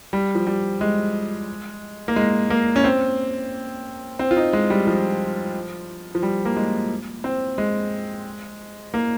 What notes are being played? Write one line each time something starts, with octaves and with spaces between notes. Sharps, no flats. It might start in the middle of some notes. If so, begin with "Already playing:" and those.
G3
F3
G3
G#3
A#3
G#3
A#3
C#4
C4
C4
F4
D#4
G#3
G3
F3
F3
G3
A#3
G#3
C4
G#3
A#3